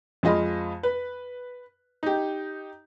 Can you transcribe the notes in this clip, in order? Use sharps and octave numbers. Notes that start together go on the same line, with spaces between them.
F2 G#3 F4 D#5 F5 B5
B4
D#4 G4